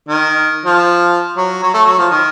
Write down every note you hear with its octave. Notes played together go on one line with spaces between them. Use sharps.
D#3
F3
F#3
F#3
A3
F#3
F3
D#3